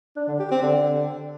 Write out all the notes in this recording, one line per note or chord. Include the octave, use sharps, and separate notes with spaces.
D4
D3
G4
C4
D3